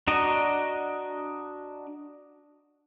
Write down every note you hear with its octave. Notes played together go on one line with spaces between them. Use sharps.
D4 F#4 D#5 A#5